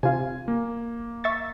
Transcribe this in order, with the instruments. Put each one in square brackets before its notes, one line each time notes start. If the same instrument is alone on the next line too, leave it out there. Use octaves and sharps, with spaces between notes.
[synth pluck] C3 F4 [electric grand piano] G#5
[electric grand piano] A#3
[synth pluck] E5 C#6 A6